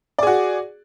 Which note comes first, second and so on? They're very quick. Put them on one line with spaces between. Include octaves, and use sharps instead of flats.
D5 G#4 F#4